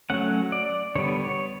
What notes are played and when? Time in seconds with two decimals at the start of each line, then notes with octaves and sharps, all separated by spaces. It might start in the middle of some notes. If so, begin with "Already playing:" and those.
0.10 F#3 A3 C#4 F#5
0.52 D5
0.95 D3 G3 B3 C#5
1.24 C#5